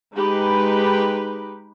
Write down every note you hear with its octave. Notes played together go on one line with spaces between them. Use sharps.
G#3 D#4 G4 B4